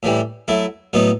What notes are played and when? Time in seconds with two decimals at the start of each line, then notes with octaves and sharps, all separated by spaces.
0.03 A2 E3 G3
0.48 F#3 A3 E4
0.93 A2 F#3 B3 D#4